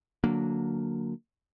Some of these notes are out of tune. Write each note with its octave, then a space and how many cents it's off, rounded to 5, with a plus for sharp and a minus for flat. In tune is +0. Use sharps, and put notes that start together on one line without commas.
D3 +0 F#3 -20 A#3 -10